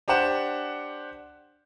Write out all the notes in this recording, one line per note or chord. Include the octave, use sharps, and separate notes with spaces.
D4 G4 C5 F#5 E7